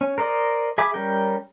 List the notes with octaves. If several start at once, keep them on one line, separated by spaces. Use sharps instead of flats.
C#4
A#4 C5 D5 D#5
G#4 E5 G#5 B5 D6
G3 C#4 A#4 G5